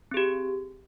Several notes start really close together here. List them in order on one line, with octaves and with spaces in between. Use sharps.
C4 G#4 G4